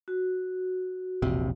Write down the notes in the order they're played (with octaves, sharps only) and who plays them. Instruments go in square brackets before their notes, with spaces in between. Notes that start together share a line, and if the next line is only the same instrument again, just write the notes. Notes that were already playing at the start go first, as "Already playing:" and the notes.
[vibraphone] F#4
[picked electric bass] E1 A#1 C3